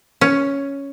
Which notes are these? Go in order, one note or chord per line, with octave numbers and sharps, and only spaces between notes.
C#4